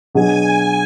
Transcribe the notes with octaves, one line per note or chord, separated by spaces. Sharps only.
B2 F#3 D4 G#4 G#5